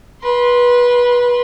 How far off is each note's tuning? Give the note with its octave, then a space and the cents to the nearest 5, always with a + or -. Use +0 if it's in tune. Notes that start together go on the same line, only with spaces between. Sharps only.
B4 -20 C6 +0